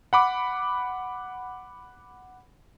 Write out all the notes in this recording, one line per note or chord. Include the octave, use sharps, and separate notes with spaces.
F#5 B5 D6